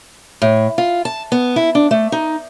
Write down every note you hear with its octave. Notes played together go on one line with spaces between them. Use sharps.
A2
F4
A5
B3
E4
D4
A3
D#4